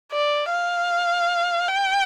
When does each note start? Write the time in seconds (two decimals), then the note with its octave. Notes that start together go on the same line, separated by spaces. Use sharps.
0.12 D5
0.51 F5
1.68 G5